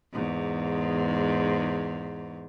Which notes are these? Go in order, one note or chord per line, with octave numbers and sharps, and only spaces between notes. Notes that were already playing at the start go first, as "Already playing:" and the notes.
E2 G#2